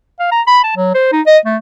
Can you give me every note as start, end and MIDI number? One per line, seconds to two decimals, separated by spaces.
0.19 0.31 77
0.32 0.41 82
0.47 0.61 83
0.63 0.74 81
0.76 0.91 54
0.94 1.10 72
1.12 1.21 63
1.26 1.38 75
1.45 1.57 57